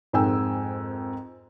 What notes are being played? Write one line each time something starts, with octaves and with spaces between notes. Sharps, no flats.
F2 G#2 A#4 G5 G#5 E6